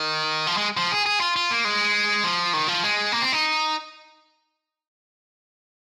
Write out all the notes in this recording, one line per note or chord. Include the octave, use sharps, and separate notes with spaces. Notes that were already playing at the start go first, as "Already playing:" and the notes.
Already playing: D#3
F3
G#3
F3
G#4
G#4
F4
F4
A#3
G#3
F3
D#3
F3
G#3
A#3
C4
D#4